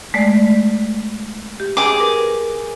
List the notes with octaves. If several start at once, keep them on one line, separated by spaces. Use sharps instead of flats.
G#3 A3 D5
G4
G#4 D6
A#4 B4